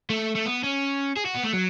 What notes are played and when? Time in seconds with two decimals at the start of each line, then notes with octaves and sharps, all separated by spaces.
0.10 A3
0.35 A3
0.46 B3
0.64 C#4
1.17 G#4
1.26 F#4
1.35 B3
1.44 A3
1.53 F#3